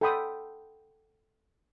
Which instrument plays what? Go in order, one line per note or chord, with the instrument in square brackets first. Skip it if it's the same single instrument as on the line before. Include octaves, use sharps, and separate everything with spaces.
[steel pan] A4 F#5 G5 B5 C6 D#6